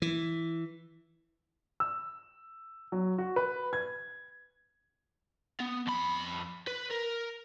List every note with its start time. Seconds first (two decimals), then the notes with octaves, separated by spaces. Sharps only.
0.02 E3
1.80 E6
2.92 F#3
3.18 F#4
3.36 B4
3.73 G#6
5.60 B3
5.87 F2 B5
6.68 B4
6.91 A#4